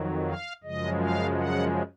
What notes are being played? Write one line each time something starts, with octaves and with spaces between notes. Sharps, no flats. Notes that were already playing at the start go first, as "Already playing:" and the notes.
Already playing: F2 D#3 F#3
F5
F#2 C#3 F3 G#3 D#5
F5
F#5